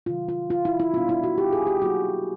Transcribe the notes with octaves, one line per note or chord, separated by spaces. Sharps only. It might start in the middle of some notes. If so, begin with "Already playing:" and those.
C3 D#3 F#3 F4
F4
F4
E4
E4
B2 G3 B3 D4 F4
E4
F#4
G4
G#4
G4
F#3 A#3 D#4 F#4